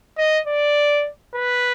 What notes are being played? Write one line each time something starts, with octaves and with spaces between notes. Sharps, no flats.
D#5
D5
B4